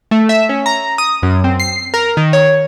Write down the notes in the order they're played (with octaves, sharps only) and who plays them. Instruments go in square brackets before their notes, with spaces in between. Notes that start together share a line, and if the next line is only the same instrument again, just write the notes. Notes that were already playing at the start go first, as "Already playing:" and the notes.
[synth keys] A3
E5
C#4
A#5
D#6
F#2
C4
C7
A#4
D#3
C#5